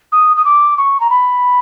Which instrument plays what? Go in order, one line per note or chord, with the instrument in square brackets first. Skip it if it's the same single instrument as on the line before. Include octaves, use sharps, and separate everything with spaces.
[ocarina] D#6
D#6
D6
C#6
A#5
B5